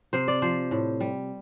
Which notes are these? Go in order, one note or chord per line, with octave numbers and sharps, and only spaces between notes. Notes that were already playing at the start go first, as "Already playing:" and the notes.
C3 C5
D5
F3 C5
A2
G3